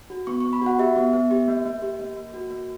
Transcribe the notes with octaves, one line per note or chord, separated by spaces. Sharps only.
F#4
B3 C#6
B3 C#6
B5
F#4 F#5
G4 E5
B3
B3
G4
A#3
A#3
G4
A#3
A#3
F#4
A#3